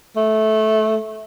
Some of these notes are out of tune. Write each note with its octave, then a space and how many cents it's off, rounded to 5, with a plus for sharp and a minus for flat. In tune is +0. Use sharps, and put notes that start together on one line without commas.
A3 -15